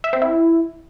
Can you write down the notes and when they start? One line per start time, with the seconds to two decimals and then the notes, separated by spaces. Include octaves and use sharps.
0.04 E5
0.13 C4
0.22 E4